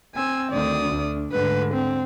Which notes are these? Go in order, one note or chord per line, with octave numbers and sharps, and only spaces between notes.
C4 G#5 E6
D2 D3 D#3 D5 D#6
D2 D4
D2 G#2 D3 B4
C4